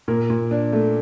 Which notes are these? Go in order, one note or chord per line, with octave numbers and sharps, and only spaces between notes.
A#2 A#4
A#2
D4
A3